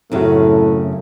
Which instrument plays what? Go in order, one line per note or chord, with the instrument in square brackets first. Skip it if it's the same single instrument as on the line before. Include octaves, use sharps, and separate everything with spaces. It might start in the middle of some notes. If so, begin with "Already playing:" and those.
[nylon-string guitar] F#2 C#3 [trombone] A2 [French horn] A3 [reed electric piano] C4 F#4